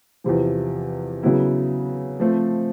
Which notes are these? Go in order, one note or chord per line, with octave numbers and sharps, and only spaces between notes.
E2 C3 F3
C#3 F#3 B3 E4
F3 A3 C4